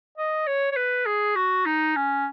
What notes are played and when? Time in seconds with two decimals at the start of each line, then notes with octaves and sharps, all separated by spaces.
0.18 D#5
0.47 C#5
0.72 C#5
0.76 B4
1.06 G#4
1.36 F#4
1.66 D#4
1.96 C#4